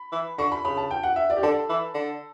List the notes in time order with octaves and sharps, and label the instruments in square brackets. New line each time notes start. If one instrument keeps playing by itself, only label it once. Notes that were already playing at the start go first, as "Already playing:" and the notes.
Already playing: [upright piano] B5
[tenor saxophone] E3
[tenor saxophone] D3 [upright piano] C#6
[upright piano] B5
[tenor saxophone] C#3 [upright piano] B5
[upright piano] A5
G5
F#5
E5
D5
G4
[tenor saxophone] D3 [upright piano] A4
[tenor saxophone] E3
D3